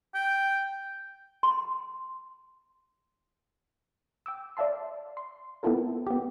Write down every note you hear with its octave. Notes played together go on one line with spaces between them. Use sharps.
G5
C6
G5 D6 E6
D5 E5 F5 A5 C6
C6
B3 C4 E4 F4 A4 A#4
B3 G4